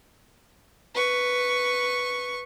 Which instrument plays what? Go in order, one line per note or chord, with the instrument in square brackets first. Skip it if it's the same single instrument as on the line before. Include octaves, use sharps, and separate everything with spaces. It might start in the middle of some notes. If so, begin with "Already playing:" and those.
[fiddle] B4 C#6